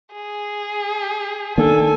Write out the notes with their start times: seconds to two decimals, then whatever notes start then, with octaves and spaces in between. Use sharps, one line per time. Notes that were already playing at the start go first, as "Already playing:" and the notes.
0.13 G#4
1.58 D#3 A#3 D4 A4 G#5